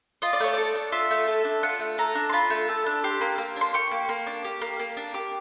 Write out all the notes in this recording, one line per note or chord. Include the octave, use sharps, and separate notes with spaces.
F4 D#5
D5
A3 C#5
A4 D5
D4
F4 E5
A3
A4
D4
F4 F#5
A3
A4 A#5
D4
C6
F4 B5
A3
A4
D4
G4 C6
A#3
A#3
D4 C6
G4 C#6
A#3
A#3
D4
G4
A#3
A#3
D4
G4 D6